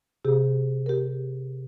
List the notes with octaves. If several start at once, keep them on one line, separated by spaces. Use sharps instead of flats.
C3 G4 G#4
G4 A#4